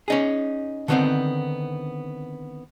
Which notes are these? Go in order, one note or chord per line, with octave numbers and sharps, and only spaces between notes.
C#4 D#4 G#4
D3 D#3 A3 B3 C4 D#4